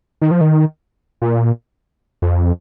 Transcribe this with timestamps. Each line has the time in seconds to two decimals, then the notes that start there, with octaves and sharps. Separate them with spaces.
0.22 D#3
0.31 F3
0.41 D#3
1.22 A#2
2.22 F2